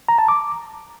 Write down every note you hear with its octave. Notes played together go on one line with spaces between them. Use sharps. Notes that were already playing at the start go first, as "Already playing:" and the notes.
A#5
A5
D6